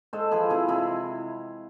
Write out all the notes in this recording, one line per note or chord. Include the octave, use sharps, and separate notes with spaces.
G#3 A4 C5
F3 G#4 B4
C3 E4 G#4
C3 E4 G#4